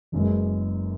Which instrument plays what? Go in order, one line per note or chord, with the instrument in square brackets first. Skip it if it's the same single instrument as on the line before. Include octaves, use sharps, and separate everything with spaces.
[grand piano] F#1 F#2 C#3 G#3 B3